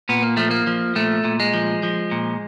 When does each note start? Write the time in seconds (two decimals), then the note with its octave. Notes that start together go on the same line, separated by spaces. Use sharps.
0.09 A#2 B3
0.22 A#3
0.37 F3 A3
0.51 A#3
0.67 F3
0.96 A#2 A3
1.24 A#2
1.40 G#3
1.54 F3
1.83 F3
2.11 A#2